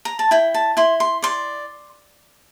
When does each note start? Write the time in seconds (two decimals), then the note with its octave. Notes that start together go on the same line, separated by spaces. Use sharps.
0.05 A#5
0.19 A5
0.31 E4 G5
0.54 A5
0.77 E4 C6
1.00 C6
1.22 D5 C6